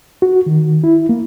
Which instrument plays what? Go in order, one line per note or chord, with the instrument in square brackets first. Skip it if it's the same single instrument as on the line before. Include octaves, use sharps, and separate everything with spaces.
[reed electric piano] F#4
D#3
E4
A#3